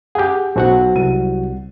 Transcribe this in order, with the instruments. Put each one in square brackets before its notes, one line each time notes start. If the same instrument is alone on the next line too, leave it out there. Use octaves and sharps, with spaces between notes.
[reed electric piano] G4 G#4 [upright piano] F#5 G6
[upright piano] B1 C5 A5 [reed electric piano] F#3 F#4 F#5
[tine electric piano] C2 [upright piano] D#7